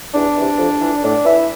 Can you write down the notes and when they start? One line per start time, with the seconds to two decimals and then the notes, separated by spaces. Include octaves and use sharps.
0.14 E2 D4
0.36 C3 E3
0.57 F2
0.80 E3
1.03 A2 D4
1.24 E3 E4